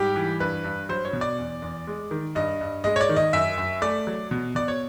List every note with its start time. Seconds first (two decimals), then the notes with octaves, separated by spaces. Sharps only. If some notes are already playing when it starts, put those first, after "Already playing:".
Already playing: G#2 G3 G4
0.16 E3
0.40 G2 B4
0.64 G2
0.89 F#3 C5
1.05 C#5
1.13 B2
1.21 D5
1.38 E2
1.62 E2
1.87 G#3
2.11 D#3
2.35 G2 D#5
2.61 G2
2.84 G#3 D#5
2.96 C#5
3.01 D5
3.09 D#3
3.16 D#5
3.33 F#2 E5
3.58 F#2
3.82 A3 D5
4.07 F#3
4.31 B2
4.55 B2 D5
4.68 C#5